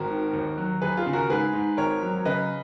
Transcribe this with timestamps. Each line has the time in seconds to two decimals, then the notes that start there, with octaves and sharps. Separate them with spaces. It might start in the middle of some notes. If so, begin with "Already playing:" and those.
Already playing: G#1 F#4 A#4
0.10 D#3
0.33 D#2
0.57 F#3
0.81 D#2 G#4 B4
0.97 F4 G#4
1.06 C#3
1.13 F#4 A#4
1.29 G#2 G#4 B4
1.53 G#2
1.77 G#1 A#4 C#5
2.02 F#3
2.25 C#3 B4 D#5